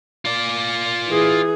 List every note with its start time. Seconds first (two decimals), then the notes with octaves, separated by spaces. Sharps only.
0.25 F4 D5
1.08 E3 G#4